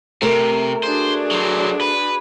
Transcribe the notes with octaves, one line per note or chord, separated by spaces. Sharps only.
C3 A3 A#4
D4 F#4 G#4 C5
F#3 C5
B4